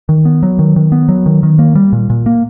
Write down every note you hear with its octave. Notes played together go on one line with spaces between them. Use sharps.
D#3
B3
F#3
D#3
D#3
B3
F#3
D#3
D#3
A#3
G3
A#2
A#2
A#3